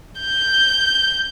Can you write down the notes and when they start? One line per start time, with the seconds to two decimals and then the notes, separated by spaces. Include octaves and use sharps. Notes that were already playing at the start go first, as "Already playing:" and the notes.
0.20 G6